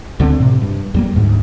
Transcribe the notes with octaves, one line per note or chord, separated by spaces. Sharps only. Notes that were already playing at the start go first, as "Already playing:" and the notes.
D2 D3 F#3 C4
A2 C3
G2
E2 G3 A#3
D2 G#2